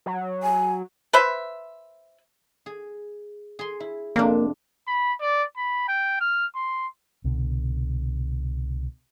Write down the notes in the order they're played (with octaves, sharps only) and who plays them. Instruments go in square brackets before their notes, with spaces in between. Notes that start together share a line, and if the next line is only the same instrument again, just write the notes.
[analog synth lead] F#3
[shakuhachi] G#5
[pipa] B4 C5 E5
[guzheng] G#4
G#4 C6
E4
[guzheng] F2 C3 D4 [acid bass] A#3
[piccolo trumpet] B5
D5
B5
G5
F6
C6
[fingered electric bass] C2 B2 D3